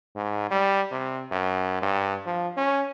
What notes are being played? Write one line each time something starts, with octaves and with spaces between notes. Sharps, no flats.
G#2
G3
C3
F#2
G2
F3
C#4